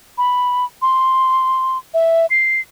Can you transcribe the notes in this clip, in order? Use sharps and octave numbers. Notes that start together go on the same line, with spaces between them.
B5
C6
E5
C7